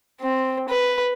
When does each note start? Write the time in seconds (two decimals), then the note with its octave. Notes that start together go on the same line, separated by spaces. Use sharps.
0.21 C4
0.69 B4